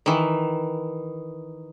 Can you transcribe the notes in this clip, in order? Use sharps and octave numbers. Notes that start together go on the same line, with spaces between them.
D#3 E3